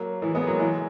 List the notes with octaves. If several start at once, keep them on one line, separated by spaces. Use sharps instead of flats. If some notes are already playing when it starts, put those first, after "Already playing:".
Already playing: F#3 A#3
E3 G#3
G#3 B3
F#3 A#3
E3 G#3